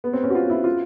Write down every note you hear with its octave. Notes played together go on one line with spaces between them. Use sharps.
B3
C4
C#4
F#4
F4
E4
F4